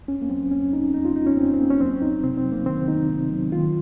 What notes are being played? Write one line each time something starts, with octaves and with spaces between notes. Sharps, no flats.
F2 C#4
A#3
F#3 C4
F2 C#4
F2 D#4
F2 D#4
F4
F2 D#4
C#4
F2 C4
C4
F2 A#3
C#4
F#3 C4
C2 D#4
C3 C4
C4
F#3
A#3
D#3 C4
D#3 D#4
C3
F#3
D#3 F4